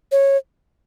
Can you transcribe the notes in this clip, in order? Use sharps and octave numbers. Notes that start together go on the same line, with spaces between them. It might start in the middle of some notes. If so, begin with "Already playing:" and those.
C#5